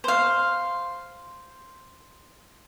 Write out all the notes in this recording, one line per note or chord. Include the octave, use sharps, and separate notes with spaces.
C5 F5